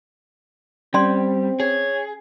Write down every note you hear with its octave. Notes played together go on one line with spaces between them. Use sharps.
G3 C4 C#4 D5 C6
G#4 C#5